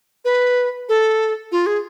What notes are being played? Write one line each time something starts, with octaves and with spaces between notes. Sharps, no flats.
B4
A4
F4
G#4